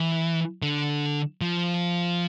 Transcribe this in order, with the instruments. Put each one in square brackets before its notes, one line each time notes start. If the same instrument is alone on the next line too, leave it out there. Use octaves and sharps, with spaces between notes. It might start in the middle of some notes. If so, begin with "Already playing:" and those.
Already playing: [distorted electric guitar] E3
D3
F3